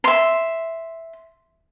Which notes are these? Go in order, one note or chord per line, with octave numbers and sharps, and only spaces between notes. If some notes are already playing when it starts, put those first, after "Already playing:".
E5 C6